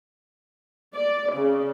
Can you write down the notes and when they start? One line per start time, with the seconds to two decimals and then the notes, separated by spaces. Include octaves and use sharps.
0.94 D5
1.33 C#3